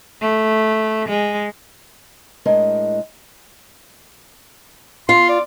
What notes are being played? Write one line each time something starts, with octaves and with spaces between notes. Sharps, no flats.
A3
G#3
A2 G#3 D4 A#4 D#5
F4 C6
D5